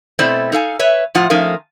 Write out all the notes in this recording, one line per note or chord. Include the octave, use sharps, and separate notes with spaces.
B2 A3 C4 E4 C5 D5
D#4 A4 F5 G#5
B4 C#5 E5
A2 F3 F4 F#5
F3 A3 C#4 D#4 A#4 F5